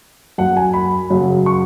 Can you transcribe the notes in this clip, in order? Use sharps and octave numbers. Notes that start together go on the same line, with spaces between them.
F#2 F#3 F#5
G#5
B5
F#2 C#3 F#3
C#6